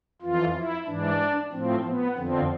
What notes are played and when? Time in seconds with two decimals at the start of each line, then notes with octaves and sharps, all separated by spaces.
0.22 F2 E3 F4
0.54 E4
0.87 G#2 E3 D4
1.52 A2 F3 C4
1.85 B3
2.18 F2 D3 F3 C4